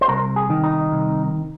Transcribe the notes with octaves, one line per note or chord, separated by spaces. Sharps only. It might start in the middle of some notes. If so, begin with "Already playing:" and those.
C5
C2 A#4
G#4
D#3
D#4
C2